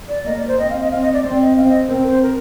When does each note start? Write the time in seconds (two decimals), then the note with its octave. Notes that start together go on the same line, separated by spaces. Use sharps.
0.09 D5
0.26 A#3 D#5
0.37 D5
0.48 C5
0.58 C4 D#5
0.70 F5
0.81 D#5
0.91 C4 F5
1.02 D#5
1.13 D5
1.24 C4 D5
1.41 D#5
1.57 C4 F5
1.68 D#5
1.89 C4 A#4
2.07 C5
2.22 A#4